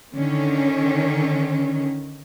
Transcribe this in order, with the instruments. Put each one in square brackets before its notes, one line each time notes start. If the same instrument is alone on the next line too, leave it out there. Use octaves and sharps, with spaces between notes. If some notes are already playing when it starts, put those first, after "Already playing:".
[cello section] D3 D#3 C#4